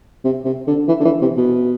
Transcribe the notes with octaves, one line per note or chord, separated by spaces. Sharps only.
C3
C3
D3
E3
D3
E3
C3
B2